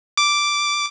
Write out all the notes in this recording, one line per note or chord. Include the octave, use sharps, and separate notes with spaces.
D6